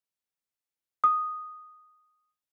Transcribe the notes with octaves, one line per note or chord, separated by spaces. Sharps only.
D#6